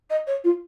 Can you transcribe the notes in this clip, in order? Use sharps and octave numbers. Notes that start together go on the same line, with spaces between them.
D#5
C#5
F4